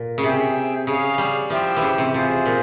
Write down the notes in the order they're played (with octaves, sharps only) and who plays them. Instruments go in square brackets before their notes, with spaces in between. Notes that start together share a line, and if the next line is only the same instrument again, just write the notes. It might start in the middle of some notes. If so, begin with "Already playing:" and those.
Already playing: [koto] A#2
C#3
[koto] C3 [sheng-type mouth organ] G#4 E5 G5
[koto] C#3 [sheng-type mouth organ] G#4 C#5 F5
[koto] G3
[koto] F3 [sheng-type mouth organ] E4 G4 C5 E5 G5
[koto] C#3 E3
C3
[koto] C3 [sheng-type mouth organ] F4 G#4 C5
[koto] A#2